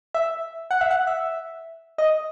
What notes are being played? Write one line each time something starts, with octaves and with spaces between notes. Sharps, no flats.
E5
F#5
E5
F#5
E5
D#5